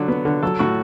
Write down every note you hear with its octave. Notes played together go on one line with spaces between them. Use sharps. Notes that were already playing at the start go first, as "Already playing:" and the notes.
Already playing: D3 F#3
B3
D3
F#3 A4
A2 F#4